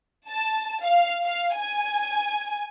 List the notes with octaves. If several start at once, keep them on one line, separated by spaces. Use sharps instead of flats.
A5
F5
F5
G#5